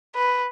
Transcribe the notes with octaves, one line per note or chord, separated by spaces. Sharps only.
B4